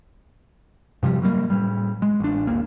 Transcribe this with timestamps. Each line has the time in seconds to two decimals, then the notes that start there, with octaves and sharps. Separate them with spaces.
1.03 G2 C3 F3 G3
1.22 F#3 G3 A#3
1.50 A2 G3
2.02 G#3
2.20 A1 D4
2.47 D1 G1 A#3